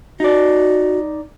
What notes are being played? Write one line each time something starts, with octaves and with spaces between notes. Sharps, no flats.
D#4 F#4 D5